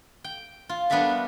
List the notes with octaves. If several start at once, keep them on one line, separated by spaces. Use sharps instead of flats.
G5
F4
G3 B3 D4 A#4 E5 A5